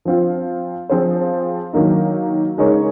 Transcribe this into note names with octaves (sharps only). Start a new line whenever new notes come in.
F3 C4 F4
F3 C4 F4 G#4 C5
D#3 F#3 A#3 D#4
C#3 G#3 D#4 A#4 C#5